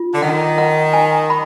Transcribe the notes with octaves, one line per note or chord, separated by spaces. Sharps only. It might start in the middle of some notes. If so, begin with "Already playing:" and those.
Already playing: F4
D3
D#3 F#5
F#5
G#5
B5